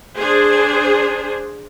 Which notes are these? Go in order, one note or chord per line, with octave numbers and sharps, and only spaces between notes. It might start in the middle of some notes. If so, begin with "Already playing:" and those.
D4 G#4 C5